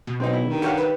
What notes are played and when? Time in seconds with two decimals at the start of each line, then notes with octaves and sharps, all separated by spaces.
0.07 B2
0.20 B1 C4 D#4
0.33 E4
0.45 G2 D#3
0.62 G4 C#5 F5 F#5
0.78 B4